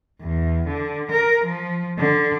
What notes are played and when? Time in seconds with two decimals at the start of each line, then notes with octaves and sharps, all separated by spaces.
0.21 E2
0.67 D3
1.12 A#4
1.44 F3
1.99 D3